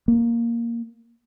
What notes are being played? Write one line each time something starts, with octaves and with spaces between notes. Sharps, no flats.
A#3